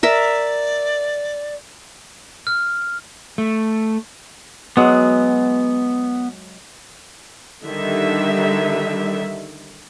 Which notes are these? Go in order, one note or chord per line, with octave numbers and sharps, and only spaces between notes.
A#4 D5 E5
F6
A3
F#3 G#3 B3
D3 D#3 G3 E5